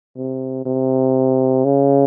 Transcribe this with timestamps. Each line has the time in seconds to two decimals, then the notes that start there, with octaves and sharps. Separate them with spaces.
0.16 C3
0.66 C3
1.65 C#3